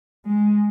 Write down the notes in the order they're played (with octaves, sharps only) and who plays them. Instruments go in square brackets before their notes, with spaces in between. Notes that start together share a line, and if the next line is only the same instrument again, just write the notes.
[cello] G#3